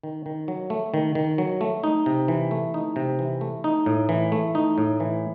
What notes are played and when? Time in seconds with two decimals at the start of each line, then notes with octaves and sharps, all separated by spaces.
0.03 D#3
0.26 D#3
0.48 F#3
0.70 A3
0.94 D#3
1.15 D#3
1.38 F#3
1.61 A3
1.84 D#4
2.06 C3
2.28 E3
2.51 A3
2.74 D#4
2.96 C3
3.19 E3
3.41 A3
3.64 D#4
3.86 A2
4.09 E3
4.32 A3
4.55 D#4
4.78 A2
5.00 E3